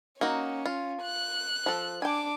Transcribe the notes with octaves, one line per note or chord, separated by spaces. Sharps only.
A#3 C#4 D#4 F#4
F4
F#6
F3 A4
D4 G5 G#5 D6